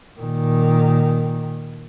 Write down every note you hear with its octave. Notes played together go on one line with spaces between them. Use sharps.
A#2 D#3